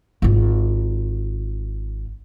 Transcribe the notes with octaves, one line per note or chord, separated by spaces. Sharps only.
G#1 F4